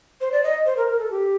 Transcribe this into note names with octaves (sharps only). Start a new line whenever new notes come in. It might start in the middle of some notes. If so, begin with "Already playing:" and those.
C5
D5
D#5
C5
A#4
A#4
A4
G4